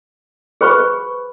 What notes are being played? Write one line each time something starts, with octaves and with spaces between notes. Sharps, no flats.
G#4 B4 C5 B5 C#6